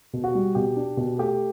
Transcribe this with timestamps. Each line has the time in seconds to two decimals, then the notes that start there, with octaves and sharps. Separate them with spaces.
0.13 B2
0.24 F#4
0.35 G3
0.55 B2 G4
0.76 D4
0.97 B2
1.18 A3 G4